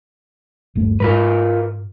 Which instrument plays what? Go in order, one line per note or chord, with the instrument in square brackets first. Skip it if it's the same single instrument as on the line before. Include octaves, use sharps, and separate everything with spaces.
[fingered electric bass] G1 D#2 A3
[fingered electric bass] G#2 G#3 [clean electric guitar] F4 A#4 B4